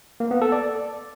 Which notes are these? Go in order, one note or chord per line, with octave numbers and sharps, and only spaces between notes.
A#3
B3
A4
D5